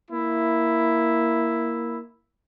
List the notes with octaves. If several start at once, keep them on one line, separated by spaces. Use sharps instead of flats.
A#3 E4